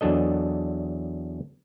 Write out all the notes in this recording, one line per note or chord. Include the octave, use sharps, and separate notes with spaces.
E2 F#3 D4 A4 D#5